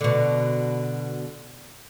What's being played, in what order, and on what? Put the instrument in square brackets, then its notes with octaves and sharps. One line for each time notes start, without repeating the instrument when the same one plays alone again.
[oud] B2 D3